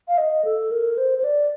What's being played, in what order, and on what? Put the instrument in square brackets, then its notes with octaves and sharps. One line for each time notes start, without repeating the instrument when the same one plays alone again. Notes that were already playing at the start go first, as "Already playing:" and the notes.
[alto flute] F5
D#5
A4
A#4
C5
C5
D5